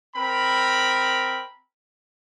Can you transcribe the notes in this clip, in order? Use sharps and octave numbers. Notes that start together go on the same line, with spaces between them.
C4 A#4 B5